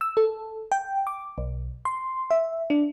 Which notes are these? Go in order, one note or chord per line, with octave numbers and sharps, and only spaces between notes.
E6
A4
G5
D6
B1
C6
E5
D4